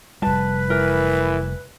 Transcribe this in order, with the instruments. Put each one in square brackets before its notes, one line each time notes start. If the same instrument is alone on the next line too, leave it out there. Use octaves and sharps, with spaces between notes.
[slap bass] F1 G3 [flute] B4 [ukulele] A5
[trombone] E3 [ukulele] A#4